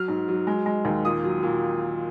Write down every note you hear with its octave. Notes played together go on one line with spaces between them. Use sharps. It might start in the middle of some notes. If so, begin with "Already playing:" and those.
Already playing: F#3 F6
G#2
F#3
G#3
G#3
D#2
A#2 D#6
F#3
A#2